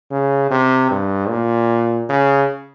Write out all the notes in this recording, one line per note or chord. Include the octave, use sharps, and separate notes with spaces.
C#3
C3
G2
A#2
C#3